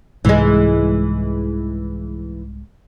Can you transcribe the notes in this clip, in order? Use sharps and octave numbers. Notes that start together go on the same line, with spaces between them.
C2 G#2 E3 G#3